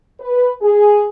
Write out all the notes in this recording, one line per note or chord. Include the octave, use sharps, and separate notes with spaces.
B4
G#4